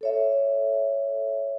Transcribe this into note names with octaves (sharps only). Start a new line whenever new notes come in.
A4 C#5 E5